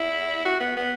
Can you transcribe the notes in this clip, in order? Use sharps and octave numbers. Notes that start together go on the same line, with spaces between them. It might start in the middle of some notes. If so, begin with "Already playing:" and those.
Already playing: E4
F#4
B3
B3